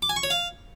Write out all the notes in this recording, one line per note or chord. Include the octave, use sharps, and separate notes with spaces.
D6
G#5
C#6
C#5
F5